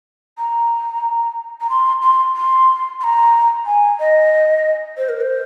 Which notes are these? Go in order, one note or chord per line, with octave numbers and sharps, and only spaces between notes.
A#5
A#5
C6
C6
C6
C6
A#5
G#5
D#5
C5
A#4
C5